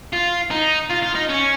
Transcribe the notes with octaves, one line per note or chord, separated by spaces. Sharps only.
F4
D#4
F4
F4
D#4
C#4